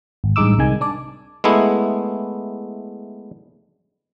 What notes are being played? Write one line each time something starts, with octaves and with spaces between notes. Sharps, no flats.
G#1
A1 G2 G#3 D#4 D6 E6
C2 C3 D#3 G#3 G#5
D4 D5
G#3 A3 B3 E4